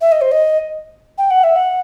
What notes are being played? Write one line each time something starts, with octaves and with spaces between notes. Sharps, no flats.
E5
D#5
C5
D#5
G5
F#5
E5
F#5